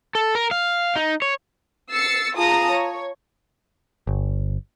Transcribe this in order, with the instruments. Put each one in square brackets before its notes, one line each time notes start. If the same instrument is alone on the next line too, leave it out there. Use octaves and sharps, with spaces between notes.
[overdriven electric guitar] A4
A#4
F5
D#4
C#5
[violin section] E6 A6 C7 C#7
F4 G#4 A5 A#5 D#6
C#5
[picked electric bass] G1